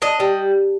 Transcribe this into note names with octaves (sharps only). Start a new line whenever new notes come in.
D4 D#5
G3